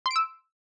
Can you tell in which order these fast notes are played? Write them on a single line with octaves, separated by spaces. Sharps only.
C6 D7 E6